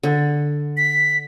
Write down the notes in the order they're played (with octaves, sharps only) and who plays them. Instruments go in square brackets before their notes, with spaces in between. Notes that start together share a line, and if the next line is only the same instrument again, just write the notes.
[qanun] D3
[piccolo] B6